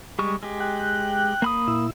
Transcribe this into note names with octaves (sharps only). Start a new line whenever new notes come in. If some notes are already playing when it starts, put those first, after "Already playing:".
G3 G#3 C#6
G#3 G4
G5 F#6
A#3 B5 D#6
A#2 E4 E6